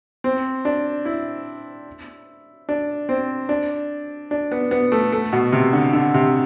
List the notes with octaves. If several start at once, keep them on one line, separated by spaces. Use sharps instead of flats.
C4
D4
E4
D4
C4
D4
D4
B3
B3
A3
A3
B2
C3
D3
D3
C3